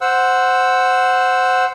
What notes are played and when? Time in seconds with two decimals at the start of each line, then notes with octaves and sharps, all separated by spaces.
0.01 C5 F#5 E6